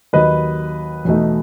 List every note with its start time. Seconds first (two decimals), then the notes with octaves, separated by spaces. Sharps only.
0.13 D#2 D#3 F#3 B4 D#5
1.05 E2 B2 A3 D#4